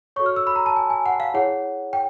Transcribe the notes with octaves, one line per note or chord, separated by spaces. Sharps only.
F#4 A4 C#5 C#6
F6
E6
B5
A#5
A5
G#5
G#5
F#5
F5
E4 G#4 C#5 F#5
G5